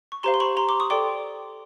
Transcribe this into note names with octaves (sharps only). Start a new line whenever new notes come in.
C#6
G4 C5 F5 A#5 C6
C6
B5 C#6
A#5 C6
C6 D6
C#6 D#6
A4 D5 G5 C6 D6